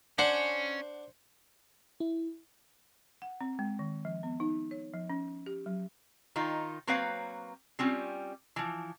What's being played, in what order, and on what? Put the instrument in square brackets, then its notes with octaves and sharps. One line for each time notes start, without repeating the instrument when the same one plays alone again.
[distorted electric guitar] C#4 [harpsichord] D4 [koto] C5 F#5
[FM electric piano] E4
[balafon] F#5
C4
G#3
D#3
F3
B3
D#4
C#5
F3
C#4
G4
F#3
[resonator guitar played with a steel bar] D#3 D#4 F4
F#3 A#3 C4 B4 C#5 F5
G3 C4 C#4 F4
E3 F3